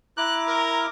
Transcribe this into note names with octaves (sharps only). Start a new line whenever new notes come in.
E4 A#5 D6 F#6
A#4